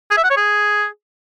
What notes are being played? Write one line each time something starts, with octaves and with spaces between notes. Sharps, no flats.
G#4
E5
F#5
C#5
G#4